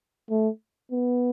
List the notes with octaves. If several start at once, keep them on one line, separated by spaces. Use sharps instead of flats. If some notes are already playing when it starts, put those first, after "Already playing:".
A3
B3